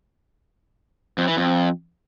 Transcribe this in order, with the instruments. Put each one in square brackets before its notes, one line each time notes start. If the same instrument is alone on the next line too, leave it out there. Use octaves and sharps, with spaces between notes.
[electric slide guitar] F2
E3
F2